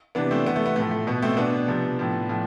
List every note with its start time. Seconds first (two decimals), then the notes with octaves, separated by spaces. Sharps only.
0.15 C3 E3 B3 D4
0.31 A3 C4
0.46 C3 E3 B3
0.56 A3
0.66 B3
0.76 A2 F3 A3
0.91 A3
1.07 B2 B3
1.22 A3 C4
1.37 B2 B3 D4
1.68 C3 F3
1.99 A2 F3
2.29 A2 F3